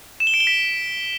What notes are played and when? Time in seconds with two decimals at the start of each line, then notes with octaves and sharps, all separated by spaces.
0.20 E7
0.27 G7
0.34 D7
0.40 G7
0.47 B6